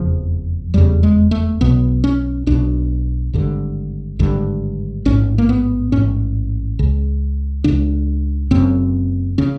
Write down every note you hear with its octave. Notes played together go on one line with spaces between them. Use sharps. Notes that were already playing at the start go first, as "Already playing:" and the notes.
Already playing: F1 E2 C#3 F3
F1 E2 C#3 G3
G#3
A3
B1 B2 B3
C#4
B1 B2 D4
G#1 G2 D3
G#1 G2 D3
A1 G#2 C#4
A#3
B3
A1 G#2 C#4
C#2 C#3
C#2 C#3 D4
F#1 F#2 C#3 C4
C#3 C#4